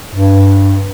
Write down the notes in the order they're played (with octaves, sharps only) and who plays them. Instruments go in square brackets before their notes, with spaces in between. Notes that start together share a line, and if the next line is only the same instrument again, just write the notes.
[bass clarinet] G2